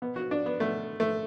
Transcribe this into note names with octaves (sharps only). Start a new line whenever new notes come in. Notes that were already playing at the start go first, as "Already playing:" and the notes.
B2 B3
F#4
D4
B3
B2 A3
A3